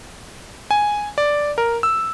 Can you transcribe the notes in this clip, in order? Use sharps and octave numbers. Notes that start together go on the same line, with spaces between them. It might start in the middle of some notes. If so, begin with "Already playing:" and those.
G#5
D5
A#4
E6